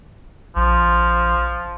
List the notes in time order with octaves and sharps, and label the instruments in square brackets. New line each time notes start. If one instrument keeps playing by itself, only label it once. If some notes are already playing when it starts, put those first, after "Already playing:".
[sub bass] A#1 [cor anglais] F3